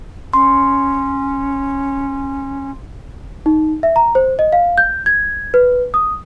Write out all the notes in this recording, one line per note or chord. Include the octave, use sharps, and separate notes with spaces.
C#4 C6
D#4
E5
A#5
C5
D#5
F5
G6
G#6
B4
D#6